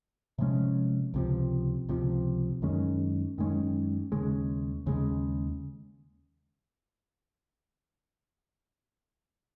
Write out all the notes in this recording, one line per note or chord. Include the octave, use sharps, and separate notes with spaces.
C3 F3 G#3 C#4
C#2 C3 F3
C#2 C3 F3
F#2 D#3 G#3 C#4
F#2 D#3 G#3 C#4
D#2 C#3 G#3
D#2 C#3 G#3